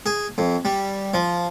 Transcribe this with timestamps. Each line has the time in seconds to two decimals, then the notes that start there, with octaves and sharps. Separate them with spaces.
0.06 G#4
0.38 F2
0.65 G3
1.14 F3